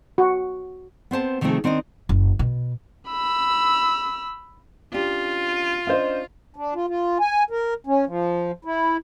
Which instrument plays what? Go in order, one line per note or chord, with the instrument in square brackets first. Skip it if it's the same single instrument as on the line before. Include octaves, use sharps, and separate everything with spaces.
[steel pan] F#4
[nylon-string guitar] B3 C4 C5 A5
C3 D#3 F3 A3 C4 G#4
D#3 C4 D4 A#4 D#5
[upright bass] F#1
B2
[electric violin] B5 E6
[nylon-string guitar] C#4 D4 G4 [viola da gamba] F4
[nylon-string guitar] C#4 D4 [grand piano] C5 D#5 F5
[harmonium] D4
F4
F4
G#5
A#4
C#4
F3
E4